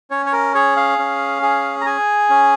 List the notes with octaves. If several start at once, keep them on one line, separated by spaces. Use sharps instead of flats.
C#4 C#5
C#5
A#4
G#4 C#5
F5
C#4
G#4
A#5
G#4 G#5
C#4